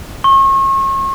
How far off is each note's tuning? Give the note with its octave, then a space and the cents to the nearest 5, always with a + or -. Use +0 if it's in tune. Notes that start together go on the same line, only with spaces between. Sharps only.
C#6 -40